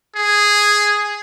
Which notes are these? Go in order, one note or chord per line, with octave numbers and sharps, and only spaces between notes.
G#4